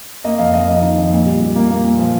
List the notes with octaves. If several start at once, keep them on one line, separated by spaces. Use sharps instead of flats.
A#3 D#5
F2 F5
F2 D#5
A#3 D#5
D#3
F2
A#2
G3
G3
A#3
A#3
A#2
F3